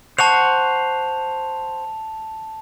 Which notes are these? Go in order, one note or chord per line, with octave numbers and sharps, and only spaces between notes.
C5 F#5 A5 C#6 F7